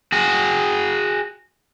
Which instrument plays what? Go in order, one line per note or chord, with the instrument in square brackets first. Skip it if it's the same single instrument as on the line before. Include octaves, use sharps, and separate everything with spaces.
[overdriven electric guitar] F#4 G#4